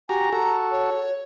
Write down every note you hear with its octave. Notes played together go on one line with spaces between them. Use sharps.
F#4 G4 G#5 A#5
F#4 A4 A#5
C#5